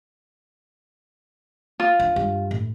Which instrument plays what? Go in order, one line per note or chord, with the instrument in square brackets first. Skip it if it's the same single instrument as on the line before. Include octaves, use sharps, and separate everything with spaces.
[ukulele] F4
[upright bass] E3 D4
G2
A2